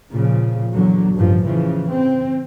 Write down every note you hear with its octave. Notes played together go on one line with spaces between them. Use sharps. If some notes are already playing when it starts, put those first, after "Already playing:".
A#2 C#3 F3
E2 D3 F#3
A1 G2 C#3 F3
C#3 E3 F3
C4